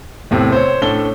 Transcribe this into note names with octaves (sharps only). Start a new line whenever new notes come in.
E2 A2 C3 C4
C5 C#5
A2 C#4 D4 A4 G7